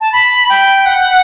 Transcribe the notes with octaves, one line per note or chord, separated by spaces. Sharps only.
A5
B5
G5
F#5